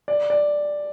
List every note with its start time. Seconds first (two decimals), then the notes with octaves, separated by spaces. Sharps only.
0.08 D5
0.30 D5